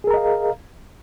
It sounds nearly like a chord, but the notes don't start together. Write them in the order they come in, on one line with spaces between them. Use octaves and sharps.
G#4 A#4 A#5 D#5 F5